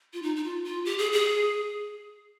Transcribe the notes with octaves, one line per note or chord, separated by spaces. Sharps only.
F4
D#4
D#4
F4
F4
G4
G#4
G#4